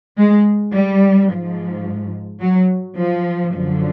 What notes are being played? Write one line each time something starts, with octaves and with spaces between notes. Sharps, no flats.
G#3
G3
G#2 F3
F#3
F3
F#2 D3 F3